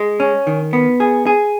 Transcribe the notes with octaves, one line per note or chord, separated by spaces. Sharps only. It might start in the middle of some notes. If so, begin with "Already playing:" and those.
Already playing: G#3
C#4
D#3
B3
G#4
G#4